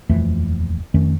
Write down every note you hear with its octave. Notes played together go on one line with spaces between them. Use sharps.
D#1 F2 E3 A3
F2 D#3 A3 C#4